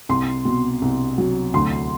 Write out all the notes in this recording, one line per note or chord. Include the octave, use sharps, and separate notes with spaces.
C2 C6
B2
C2
F#3
D2 C6